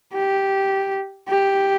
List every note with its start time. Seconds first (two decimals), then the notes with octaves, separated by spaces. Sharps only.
0.14 G4
1.29 G4